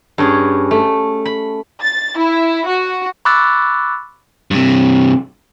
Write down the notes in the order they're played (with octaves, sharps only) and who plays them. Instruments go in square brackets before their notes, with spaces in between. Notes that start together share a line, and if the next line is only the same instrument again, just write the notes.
[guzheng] G2 C#4 G#4
A3
B5
[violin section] A6
E4
F#4
[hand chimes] B5 C#6 D6 E6 F#6 A6
[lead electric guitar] G2 C3